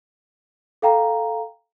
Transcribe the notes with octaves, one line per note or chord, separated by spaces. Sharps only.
A4 F5 G5 A#5